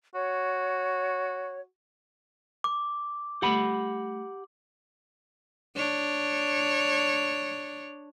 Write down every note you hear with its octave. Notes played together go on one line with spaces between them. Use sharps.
F#4 C#5
D6
G3 A3 G4 F#5 B5
D4 C#5